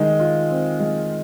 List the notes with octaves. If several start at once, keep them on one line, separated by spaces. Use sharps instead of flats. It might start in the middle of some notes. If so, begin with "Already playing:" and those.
Already playing: D#3 G#3
F4
C4
G#3